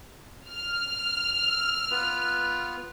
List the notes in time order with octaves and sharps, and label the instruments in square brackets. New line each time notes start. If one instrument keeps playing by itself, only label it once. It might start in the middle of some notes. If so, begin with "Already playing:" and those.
[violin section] F6
[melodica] E6
B3 F4 B4